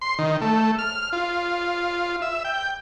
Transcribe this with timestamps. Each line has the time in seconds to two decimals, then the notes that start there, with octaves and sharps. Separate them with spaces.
0.01 C6
0.19 D#3
0.41 A3
0.79 F6
1.13 F4
2.22 E5
2.45 G5